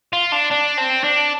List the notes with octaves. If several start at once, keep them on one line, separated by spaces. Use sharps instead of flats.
F4
D4
D4
C4
D4